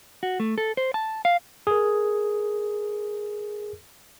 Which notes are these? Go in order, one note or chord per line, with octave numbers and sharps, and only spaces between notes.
F#4
A3
A4
C5
A5
F5
G#4 A#4